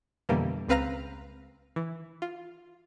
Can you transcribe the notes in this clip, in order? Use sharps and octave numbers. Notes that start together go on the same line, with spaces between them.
F2 B2 D3 E3 G3 A#3
C#2 C4 B4 F5 A#5 A#6
E3
F4